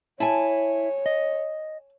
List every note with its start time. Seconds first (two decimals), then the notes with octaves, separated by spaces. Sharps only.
0.20 E4 C#5 G#5 A5
1.06 D#5